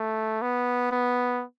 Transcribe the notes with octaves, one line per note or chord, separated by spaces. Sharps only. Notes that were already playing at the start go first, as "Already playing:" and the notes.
Already playing: A3
B3
B3